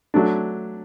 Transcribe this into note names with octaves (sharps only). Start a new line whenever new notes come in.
F#3 A3 D4